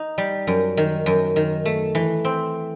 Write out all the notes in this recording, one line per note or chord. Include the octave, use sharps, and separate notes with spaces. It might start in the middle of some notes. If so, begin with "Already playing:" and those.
Already playing: D#4
G3
F#2
D#3
F#2
D#3
A3
E3
C4